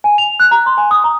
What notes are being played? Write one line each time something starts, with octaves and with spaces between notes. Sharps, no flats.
G#5
F7
F#6
A#5
C6
G#5
D#6
A#5